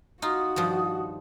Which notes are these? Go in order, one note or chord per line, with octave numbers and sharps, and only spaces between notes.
D#4 F4 F#4 D#6
G2 D#3 F3